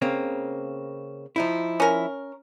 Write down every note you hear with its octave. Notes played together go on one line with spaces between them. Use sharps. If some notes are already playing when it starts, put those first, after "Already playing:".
C#3 A#3 C4
F3 D#4 E4
C#4 A#4